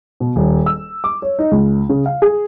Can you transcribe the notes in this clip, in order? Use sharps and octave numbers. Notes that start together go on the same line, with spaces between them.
B2
D#1
E6
D6
C#5
D#4
C#2
C#3
F5
G#4